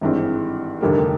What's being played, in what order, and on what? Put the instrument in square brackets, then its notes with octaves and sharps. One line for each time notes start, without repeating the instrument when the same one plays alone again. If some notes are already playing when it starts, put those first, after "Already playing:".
[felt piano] G#1 G2 E3 G#3 C4
F1 D#2 D3 G3 A#3